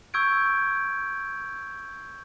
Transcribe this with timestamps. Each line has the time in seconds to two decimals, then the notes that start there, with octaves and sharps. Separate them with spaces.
0.14 C#6 E6 G6 G#6 D7